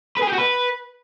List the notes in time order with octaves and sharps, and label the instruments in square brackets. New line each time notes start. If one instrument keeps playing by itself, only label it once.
[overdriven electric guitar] B4
G#4
G4
F#4
B4